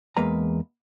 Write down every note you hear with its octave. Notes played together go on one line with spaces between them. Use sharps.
E2 G#3 A#3 B4 A#5